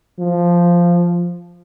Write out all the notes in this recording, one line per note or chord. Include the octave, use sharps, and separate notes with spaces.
F3